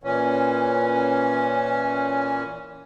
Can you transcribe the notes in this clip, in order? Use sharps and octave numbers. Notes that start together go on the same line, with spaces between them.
A#2 E3 C#4